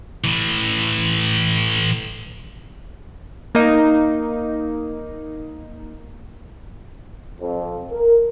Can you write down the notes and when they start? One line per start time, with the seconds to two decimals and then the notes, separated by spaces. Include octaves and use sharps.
0.24 A2 E3
3.55 A#3 D#4
7.41 F2
7.92 A#4